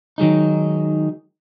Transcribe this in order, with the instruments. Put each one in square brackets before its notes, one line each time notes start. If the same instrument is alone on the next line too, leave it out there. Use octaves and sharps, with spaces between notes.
[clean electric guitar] D#3 F#3 G#3 D#4